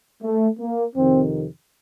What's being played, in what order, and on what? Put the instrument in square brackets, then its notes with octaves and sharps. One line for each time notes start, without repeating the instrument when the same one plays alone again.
[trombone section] A3
A#3
F2 C3 D#3 C4